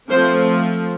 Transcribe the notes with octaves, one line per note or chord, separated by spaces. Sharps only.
F3 A3 C4 C5